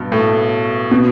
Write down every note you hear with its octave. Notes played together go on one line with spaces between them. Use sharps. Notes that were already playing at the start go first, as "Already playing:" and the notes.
Already playing: G2 B2
A2
B2